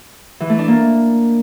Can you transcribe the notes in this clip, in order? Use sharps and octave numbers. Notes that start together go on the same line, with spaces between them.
E3
A3
D4
A#3